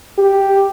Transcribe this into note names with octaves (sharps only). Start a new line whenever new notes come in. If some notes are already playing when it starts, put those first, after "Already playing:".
G4